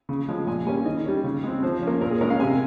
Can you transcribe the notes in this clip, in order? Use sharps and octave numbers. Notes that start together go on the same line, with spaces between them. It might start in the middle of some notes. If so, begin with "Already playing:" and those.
C#3
F3 G#3 C#4
A#2 G#5
G3 A#3 C#4 G#5
D#3 D#5
G3 C#4
C#3
G#3 C4
F3 C5
A#3 C#4
A#2 A#4
G#4
G#3 C#4 A#4
F5
C3 G#5